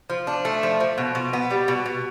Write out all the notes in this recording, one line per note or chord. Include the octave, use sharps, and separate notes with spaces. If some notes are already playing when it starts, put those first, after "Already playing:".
F3
D4
A3
F3
F3
B2
B2
B3
G3
B2
B2